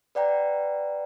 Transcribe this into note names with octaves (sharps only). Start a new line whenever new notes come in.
B4 D5 F#5 G5 A#5